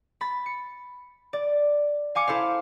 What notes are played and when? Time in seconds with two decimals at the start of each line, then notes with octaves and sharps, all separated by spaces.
0.21 B5 A6
0.46 C#7
1.33 D5
2.15 F5 G#5 D6 C#7
2.27 E4 A4 C5 F5